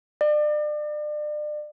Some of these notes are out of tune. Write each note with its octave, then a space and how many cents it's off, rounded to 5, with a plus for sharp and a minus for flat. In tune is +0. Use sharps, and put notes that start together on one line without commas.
D5 +35